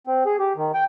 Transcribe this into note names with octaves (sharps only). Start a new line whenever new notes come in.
C4
G#4
G4
D#3
G5